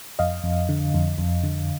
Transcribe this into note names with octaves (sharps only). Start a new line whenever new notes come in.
F2 D#5 F5
F2
D3
F2
F2
D3